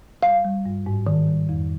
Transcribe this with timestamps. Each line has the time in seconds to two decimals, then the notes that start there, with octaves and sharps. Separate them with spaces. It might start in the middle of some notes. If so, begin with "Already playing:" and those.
0.23 G3 F5
0.45 G3
0.66 G2
0.86 G#2
1.07 D#3
1.28 G3
1.49 F2